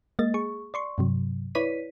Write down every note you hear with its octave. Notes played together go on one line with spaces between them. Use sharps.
G#3 A#3 D#5 A6
G#4 C#6
D5 C6 C#6
G2 C3 F#3
E4 B4 C#5 D5 B6 D#7